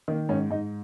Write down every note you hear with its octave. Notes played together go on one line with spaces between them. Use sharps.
D#3 A#3
G#2 C#4
G#2 D#4